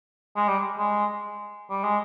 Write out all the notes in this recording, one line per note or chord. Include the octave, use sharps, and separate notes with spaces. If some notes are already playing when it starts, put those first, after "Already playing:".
G#3
G3
G#3
G3
G#3